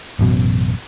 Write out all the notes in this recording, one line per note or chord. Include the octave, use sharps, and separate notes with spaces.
A1 F#2 B2